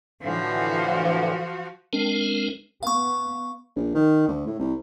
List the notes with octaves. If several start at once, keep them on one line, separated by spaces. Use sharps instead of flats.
A2 D3 E3 F3 F#4
G#3 C4 D4 A#4
B3 F5 C#6
A#1
D#3
D2
A2
C2